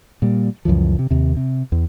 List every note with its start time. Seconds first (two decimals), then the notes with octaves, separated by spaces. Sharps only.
0.22 A#2 G3
0.65 C#2 F#2 E3 F3
0.99 C3
1.11 D#2 C3
1.37 C3
1.72 E2